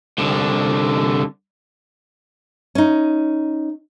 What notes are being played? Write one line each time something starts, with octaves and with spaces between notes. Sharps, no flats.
C2 D3
C#4 D#4